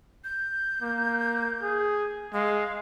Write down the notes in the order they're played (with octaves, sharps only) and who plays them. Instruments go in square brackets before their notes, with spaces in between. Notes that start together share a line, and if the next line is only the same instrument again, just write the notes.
[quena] G6
[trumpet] A#3
G#4
[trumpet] G#3 [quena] F5